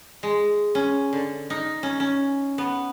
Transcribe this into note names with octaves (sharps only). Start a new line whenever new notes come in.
G#3
C#4
D3
D#4
C#4
C#4
B3